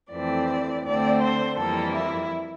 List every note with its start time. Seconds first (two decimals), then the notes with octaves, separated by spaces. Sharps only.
0.11 F2 E3 A3 C4 D5
0.84 D2 D3 A3 C4 D5
1.22 C5
1.57 F2 E3 G3 A#3 A4
1.94 E4